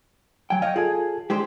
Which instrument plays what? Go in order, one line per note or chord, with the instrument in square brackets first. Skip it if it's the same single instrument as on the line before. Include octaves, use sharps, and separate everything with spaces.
[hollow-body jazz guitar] F#3 G5 [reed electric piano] G#5
[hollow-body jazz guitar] C#5 D#5 [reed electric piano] F5 G5
[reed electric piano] F4 A4 G#5 [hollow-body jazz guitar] G#4
[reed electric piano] G#3 D4 [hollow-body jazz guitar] G4 G#4 C5